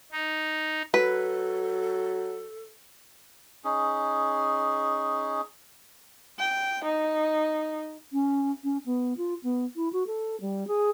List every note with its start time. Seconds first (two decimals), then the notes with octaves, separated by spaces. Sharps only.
0.12 D#4
0.94 F#3 A4 B4
3.64 C#4 D#4 G#4
6.38 G5
6.85 D#4
8.13 C#4
8.64 C#4
8.86 B3
9.17 F4
9.43 B3
9.76 E4
9.93 F#4
10.07 A4
10.41 G3
10.68 G#4